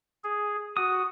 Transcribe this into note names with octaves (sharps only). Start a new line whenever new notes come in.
G#4
F#4 D#6